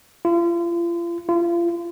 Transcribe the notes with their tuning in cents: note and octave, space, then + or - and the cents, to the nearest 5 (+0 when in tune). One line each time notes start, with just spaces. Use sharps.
F4 -40
F4 -35